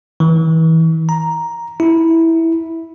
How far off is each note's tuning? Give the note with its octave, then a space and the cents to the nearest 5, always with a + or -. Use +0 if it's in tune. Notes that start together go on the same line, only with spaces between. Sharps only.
E3 -35
A#5 +5
E4 -10